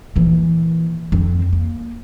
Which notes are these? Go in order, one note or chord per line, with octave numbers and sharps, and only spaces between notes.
A#2 E3
F2 C4
A#3